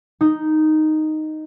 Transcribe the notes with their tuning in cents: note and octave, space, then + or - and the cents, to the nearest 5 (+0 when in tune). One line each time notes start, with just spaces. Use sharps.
D#4 -5